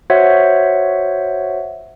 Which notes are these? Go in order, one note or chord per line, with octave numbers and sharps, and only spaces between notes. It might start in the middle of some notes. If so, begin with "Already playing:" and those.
F#4 C5 C#5 E5 F#5